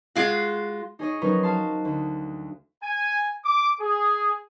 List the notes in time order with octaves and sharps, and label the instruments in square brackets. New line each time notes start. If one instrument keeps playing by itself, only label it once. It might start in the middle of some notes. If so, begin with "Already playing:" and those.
[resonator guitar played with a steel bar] G#3 F4 F#4
[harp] D#4 G#4 C#5 D#5
F3 F#3 C#4 D#4 A#4 B4
F#4 F5 A5 C6
D2
[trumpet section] G#5
D6
G#4